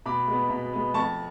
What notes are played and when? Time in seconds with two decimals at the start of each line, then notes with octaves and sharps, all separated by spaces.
0.06 B2 B5 D6
0.28 G#3
0.33 B3
0.50 B2
0.73 G#3 B3
0.94 F2 A5 C#6